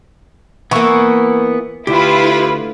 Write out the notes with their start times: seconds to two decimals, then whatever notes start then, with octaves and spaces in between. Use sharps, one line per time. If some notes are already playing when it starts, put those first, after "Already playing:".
0.71 E3 A#3 B3 C#6
1.87 D2 E4 F4 G4 B4